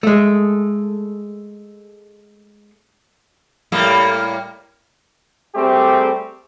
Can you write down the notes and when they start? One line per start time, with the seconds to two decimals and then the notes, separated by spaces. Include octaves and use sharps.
0.03 G#3 A3
3.72 A2 G3 A#3
5.55 G3 A3 C4 G4 G#4